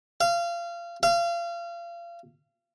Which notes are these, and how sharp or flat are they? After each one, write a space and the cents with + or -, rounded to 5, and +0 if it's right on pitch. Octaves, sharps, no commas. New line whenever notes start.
F5 -25
F5 -30